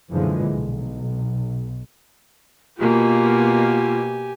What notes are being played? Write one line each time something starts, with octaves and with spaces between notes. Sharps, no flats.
F#2 A#2 D3 E3 F3 G#3
B1
B2 A#3 F4 G4 G#5